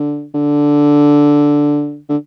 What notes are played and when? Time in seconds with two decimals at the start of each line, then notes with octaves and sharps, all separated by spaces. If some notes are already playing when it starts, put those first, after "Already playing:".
Already playing: D3
0.34 D3
2.09 D3